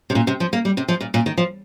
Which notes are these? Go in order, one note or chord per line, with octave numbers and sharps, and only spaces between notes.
C3
A#2
C3
F3
A#3
G3
C3
F3
A#2
A#2
D#3
F3